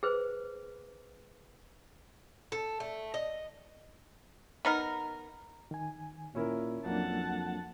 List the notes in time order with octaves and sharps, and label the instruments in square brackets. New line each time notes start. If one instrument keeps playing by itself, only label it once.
[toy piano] G#4 B4 C5
[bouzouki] A4
A3
D#5
[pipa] B3 D#4 A#4
[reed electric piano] D#3 G#5
[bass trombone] A#2 [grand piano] C#4 E4 A#4
[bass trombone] F2 [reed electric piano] F#3 A#3 D4 [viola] F#5 A5